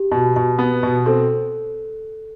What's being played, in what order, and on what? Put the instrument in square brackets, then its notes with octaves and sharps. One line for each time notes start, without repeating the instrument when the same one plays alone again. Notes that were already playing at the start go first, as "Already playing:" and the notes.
Already playing: [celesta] G4
[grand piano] B2
B2
B3
B2
[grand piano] C4 [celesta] A4